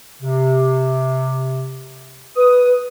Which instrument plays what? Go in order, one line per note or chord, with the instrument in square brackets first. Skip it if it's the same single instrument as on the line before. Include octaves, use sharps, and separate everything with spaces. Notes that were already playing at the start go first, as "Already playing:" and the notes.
[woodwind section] C3
[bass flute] B4 [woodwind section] D#6